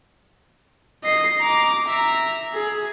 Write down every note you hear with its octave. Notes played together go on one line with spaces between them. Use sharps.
D#5 C7
A#5 D6
E5 A#5
G#4